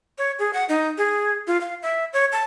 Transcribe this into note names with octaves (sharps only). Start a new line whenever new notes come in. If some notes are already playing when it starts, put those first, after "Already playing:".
C#5
G#4
F#5
D#4
G#4
F4
F5
E5
C#5
A5